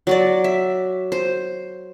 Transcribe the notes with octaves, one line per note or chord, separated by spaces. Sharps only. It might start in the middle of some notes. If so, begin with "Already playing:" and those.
F#3 F#4 D5
E5
C5